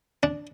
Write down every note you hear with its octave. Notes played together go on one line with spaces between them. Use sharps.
D4